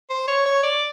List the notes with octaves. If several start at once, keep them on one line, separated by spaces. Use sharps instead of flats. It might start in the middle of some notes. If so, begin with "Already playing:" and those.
C5
C#5
C#5
D5